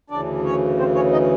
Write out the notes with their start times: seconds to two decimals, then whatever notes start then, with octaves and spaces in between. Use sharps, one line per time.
0.10 D2 C#3 E3 D4 D5
0.44 C#4 C#5
0.78 C4 C5
0.95 C#4 C#5
1.12 D#4 D#5